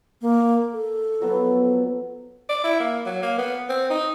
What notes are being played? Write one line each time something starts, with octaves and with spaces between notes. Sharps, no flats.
A#3
A4
F3 F#3 B3
D5
E4
A#3
F#3
A#3
B3
C4
D#4